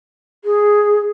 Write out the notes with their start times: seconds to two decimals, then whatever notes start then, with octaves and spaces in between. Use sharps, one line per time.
0.44 G#4